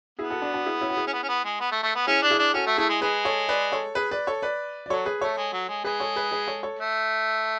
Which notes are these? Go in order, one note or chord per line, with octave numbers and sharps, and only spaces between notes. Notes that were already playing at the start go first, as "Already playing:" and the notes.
B3 E4 G#4
F#4 A4
D4 F#4
D4 F#4
E4 G#4
C#4 E4
F#4
E4 G#4
C#4
B3
C#4
B3
G#3
B3
A3
A3
B3
C#4 E4 G#4
D4
E4 G#4
D4
C#4 F#4 A4
A3
A3 E4 G#4
G#3
G#3 G#4 B4
A4 C#5
B4 D5
A4 C#5
G#4 B4
B4 D5
A4 C#5
B4 D5
D5
F#3 A4 C#5
G#4 B4
A3 A4 C#5
G#3
F#3
G#3
G#3 G#4 B4
A4 C#5
G#4 B4
G#4 B4
A4 C#5
A4 C#5
A3